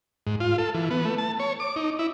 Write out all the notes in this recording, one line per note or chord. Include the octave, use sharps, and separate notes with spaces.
G#2
F4
A4
E3
B3
A3
A5
C#5
D6
D#4
E4